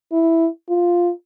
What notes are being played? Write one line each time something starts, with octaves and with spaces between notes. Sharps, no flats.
E4
F4